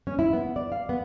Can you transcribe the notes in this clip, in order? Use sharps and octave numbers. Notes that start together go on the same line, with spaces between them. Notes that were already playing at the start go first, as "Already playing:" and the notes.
C#4
E4
B3
D5
F5
B3